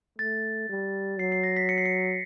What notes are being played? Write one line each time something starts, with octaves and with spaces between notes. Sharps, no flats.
A3 A6
G3
F#3 C7
C7
A#6
B6
C#7
C7
C#7